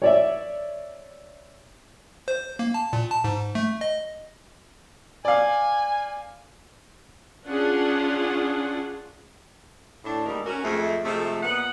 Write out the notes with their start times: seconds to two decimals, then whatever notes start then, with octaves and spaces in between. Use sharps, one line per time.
0.02 C#5 D5 E5
2.28 C5
2.59 A#3
2.74 A5
2.93 A#2
3.11 A5
3.24 G#2
3.55 A3
3.81 D#5
5.25 D5 F5 G#5
7.47 C#4 D4 F4 G#4 F#5
10.05 A2 D4
10.26 D2 G#2 D#3 G3 A#3 A#4
10.46 C#4 F#4 A#4
10.64 F2 G#3 A3
11.04 C3 F3 G#3 A3
11.42 A#2 B3 D#5 F#5